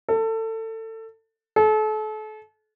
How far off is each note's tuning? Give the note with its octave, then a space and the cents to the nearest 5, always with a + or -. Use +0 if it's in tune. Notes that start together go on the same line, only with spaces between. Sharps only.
A4 +25
A4 -35